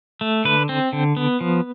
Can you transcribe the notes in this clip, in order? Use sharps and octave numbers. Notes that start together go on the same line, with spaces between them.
A3
D3 B4
C4
D3
B3
F3